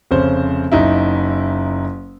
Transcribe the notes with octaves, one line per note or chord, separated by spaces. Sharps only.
F1 C#3 C5
F#1 D#4 E4